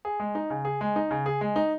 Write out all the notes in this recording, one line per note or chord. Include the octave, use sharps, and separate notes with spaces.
G#4
G#3
D#4
C#3
G#4
G#3
D#4
C#3
G#4
G#3
D#4